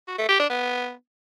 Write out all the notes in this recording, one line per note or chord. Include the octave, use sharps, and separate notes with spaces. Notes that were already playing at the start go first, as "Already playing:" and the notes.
F#4
A3
G4
D4
B3